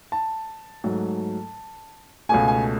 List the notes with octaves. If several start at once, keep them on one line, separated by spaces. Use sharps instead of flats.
A5
G#2 F#3 A3
C#2 B2 A3 G#5
G#5